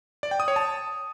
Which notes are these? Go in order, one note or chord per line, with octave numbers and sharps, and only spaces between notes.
D5
G5
D#6
C#5
A5